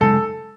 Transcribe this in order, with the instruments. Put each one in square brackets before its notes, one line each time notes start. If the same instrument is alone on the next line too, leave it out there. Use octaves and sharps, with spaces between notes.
[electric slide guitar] F#2 C#3 G#3 D#4 [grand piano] A4